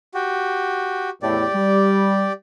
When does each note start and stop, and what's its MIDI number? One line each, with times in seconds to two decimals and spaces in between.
0.14 1.10 66
0.14 1.10 67
1.22 1.45 40
1.22 1.45 45
1.22 2.32 67
1.22 2.32 74
1.54 2.28 55